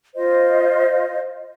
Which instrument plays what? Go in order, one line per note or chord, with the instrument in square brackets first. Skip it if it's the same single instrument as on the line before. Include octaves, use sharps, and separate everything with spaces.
[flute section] F4 C5 D#5